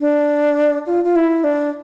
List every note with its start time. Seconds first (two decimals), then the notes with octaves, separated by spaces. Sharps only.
0.01 D4
0.86 F4
1.04 F4
1.16 E4
1.44 D4